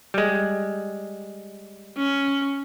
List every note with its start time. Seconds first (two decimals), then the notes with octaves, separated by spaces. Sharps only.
0.14 G3 G#3
1.97 C#4